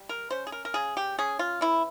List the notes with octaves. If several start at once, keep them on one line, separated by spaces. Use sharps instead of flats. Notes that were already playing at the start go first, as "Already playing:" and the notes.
Already playing: G3
A#4
C#4 C5
G#4
A#4
A#4
C#3 G#4
G4
C#4 G#4
F4
E3 E4